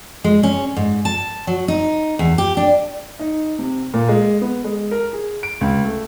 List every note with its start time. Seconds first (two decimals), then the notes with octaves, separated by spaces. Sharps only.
0.24 G#3
0.43 C#4
0.77 G#2
1.05 A5
1.47 F#3
1.68 D#4
2.19 E2
2.38 G4
2.57 D4
3.19 D#4
3.59 C3
3.94 A#2
4.09 G#3
4.41 B3
4.64 G#3
4.91 A#4
5.13 G#4
5.43 D7
5.61 C#2
5.84 A3